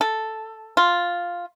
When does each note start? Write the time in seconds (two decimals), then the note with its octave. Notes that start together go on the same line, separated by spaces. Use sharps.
0.01 A4
0.77 F4